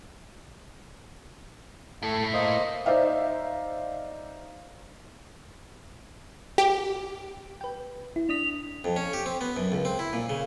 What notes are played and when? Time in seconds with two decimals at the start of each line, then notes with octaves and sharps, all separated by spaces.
2.03 A2 A3 E4
2.33 A#3 C5 D#5
2.86 D#4 C5 D5 E5 F5
6.58 G4
7.61 B4 G5
8.16 E4
8.29 D4 D#6 B6 F7
8.84 F2
8.96 C#4
9.13 G4
9.26 C4
9.41 B3
9.56 F#2
9.72 C#2
9.85 C4
9.99 E4
10.13 A#2
10.30 C#3